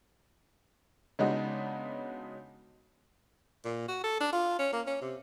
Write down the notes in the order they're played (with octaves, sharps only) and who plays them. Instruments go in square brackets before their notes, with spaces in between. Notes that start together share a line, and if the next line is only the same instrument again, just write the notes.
[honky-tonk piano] C#3 G#3 B3 D4 D#4 F#4
[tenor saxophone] A#2
F#4
A4
D4
F4
C#4
A#3
C#4
C3